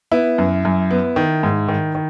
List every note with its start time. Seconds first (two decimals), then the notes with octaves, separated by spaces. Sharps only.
0.11 B3 E4
0.38 F#2
0.65 F#2
0.91 B3
1.16 D#3
1.43 G#2
1.68 D#3
1.95 D#3